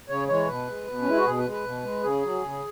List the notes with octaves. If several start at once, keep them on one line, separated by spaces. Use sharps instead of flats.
C#3 C#5
E3 G#3 C#5
B2 B4
G#3
B2
C#4
G#3 E4
F#4
B2 G#4
B4
G#3
B4
B2
G#3
C#3 G#4
F#3
C#3